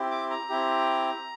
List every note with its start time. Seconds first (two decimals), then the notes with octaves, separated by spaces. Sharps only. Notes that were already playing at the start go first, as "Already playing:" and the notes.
Already playing: C4 E4 G4
0.11 D6
0.30 A#5
0.49 C4 E4 G4